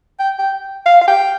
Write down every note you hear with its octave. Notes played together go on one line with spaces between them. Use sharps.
G5
G5
F5
F5
G5